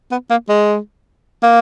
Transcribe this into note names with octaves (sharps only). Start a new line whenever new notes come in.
B3
A#3
G#3
A#3